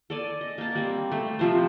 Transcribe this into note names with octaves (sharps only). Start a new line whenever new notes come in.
A4 D5 G#5
D#5
A#3 A5
G3 C4
A3 C4
C3 F3 C5